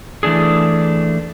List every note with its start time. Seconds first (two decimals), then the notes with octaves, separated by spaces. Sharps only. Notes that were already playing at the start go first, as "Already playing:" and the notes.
0.23 E3 A3 D4 G#4